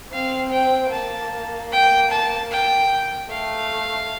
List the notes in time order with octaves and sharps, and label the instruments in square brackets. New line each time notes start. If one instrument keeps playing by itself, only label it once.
[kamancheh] C4 [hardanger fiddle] F5
[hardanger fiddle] G5
[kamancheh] A#3 [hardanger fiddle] A5
[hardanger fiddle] G5
A5
G5
[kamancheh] A3 [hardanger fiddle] F5